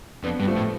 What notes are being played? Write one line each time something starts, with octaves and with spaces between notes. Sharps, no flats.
F2 B3 D4
G2
F3 A3
A2